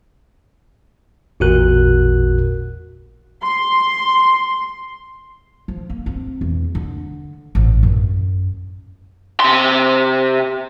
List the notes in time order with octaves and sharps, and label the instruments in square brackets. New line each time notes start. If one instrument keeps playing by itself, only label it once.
[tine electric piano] A1 E2 A#2 F#4 A#4 F#6
[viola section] C6
[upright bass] F3
A#3
C4
E2
D3
A1
F#2
[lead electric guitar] C3 C6